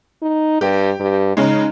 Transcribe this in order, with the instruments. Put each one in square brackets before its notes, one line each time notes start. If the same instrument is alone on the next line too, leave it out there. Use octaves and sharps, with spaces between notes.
[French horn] D#4
[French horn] G2 [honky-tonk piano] G4
[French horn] G2
[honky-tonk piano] C#3 G#3 [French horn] D#4